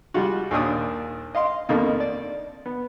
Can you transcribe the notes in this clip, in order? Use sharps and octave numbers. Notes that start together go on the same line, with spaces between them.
G3 G#3 F4 F#4
D#2 A#2 D4 D#6
D#5 F5 C6
F2 B2 D3 D#3 A3 A#3
D5
B3